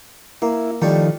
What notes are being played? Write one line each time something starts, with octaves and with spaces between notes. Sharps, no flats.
A#3 E4
A2 D#3 F3 G3 A3